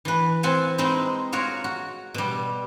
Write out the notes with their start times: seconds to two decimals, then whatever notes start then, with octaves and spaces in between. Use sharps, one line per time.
0.05 E3 B4
0.43 C4 F#5 G#5 A5
0.78 G#3 C4 D#4 E4
1.32 F4 F#4 A#4 C#5
1.64 F#4
2.14 B2 G3